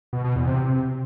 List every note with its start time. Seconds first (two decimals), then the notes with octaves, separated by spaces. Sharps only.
0.13 B2
0.24 B2
0.36 E2
0.47 C3
0.59 C3